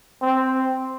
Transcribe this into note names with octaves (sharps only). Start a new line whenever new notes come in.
C4